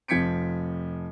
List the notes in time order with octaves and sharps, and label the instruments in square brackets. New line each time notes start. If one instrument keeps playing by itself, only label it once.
[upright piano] F1 F3 G#6 B6 C#7 D7